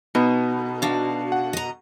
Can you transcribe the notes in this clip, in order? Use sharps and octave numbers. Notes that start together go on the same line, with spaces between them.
B2 B3 D#4
D4 F#4 F5
F#5
D#5 A#5